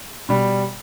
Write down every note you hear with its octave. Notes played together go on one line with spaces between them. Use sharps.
B2 G3